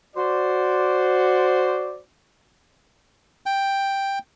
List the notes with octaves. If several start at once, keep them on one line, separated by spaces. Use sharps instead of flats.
F#4 C5 D5
G5